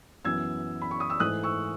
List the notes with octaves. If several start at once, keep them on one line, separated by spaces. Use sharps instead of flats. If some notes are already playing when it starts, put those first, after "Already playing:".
F#2 E3 B3 E6 G#6
B5
C#6
D#6
E6
G#2 E3 A3 D#6 F#6
C#6 E6